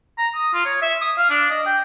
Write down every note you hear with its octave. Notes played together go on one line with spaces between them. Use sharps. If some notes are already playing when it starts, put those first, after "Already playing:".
A#5
D#6
F4
C#5
E5
D#6
F5
D4
D#5
G5